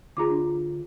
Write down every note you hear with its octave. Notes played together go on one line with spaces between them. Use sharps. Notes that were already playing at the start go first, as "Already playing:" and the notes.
D2 F4 G#4 A#5 D6
D4